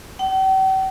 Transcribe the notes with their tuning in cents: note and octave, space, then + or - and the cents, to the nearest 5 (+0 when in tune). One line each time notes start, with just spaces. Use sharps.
G5 -45